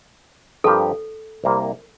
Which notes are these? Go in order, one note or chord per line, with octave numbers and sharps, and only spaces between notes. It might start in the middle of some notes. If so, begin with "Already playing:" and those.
G2 F3 C4 G4 A4 A#4
C2 C3 G3 A#3